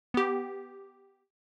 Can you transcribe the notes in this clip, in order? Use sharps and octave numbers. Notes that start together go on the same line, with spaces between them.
B3 G4